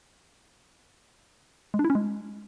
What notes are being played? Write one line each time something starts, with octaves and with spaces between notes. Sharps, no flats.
G#3
D4
E4
C#4
G#3